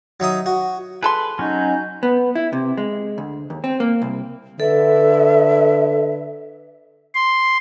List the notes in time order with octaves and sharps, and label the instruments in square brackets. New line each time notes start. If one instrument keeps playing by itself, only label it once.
[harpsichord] F#3 D#4 E5 D#6
F#4
[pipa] G#4 A4 C6 [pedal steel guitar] B4
[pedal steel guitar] F#3 C#4 [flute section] D#4 D#5 G6
[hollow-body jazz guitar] B3
E4
C3
G#3
D2
D#2
C4
A#3
C2
[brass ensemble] D3 B4 [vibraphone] A4 [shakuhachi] E5
[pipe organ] C6